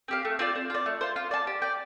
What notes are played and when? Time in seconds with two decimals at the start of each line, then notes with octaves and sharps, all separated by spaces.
0.08 C4 G4 F5
0.25 A3
0.39 C4 F4 D5
0.55 C4
0.70 F4 D5
0.86 A3
1.01 F4 C5
1.16 F4
1.31 D5 F5 A5
1.47 G4
1.62 D5 G5